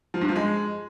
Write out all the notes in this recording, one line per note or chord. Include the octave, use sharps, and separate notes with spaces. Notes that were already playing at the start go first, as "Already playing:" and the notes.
F3
G2
F3
G#3